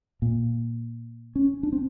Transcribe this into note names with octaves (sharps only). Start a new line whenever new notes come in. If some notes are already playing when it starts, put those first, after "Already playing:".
A#2
C#4
D4
C4